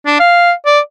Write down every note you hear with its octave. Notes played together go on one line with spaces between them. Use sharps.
D4
F5
D5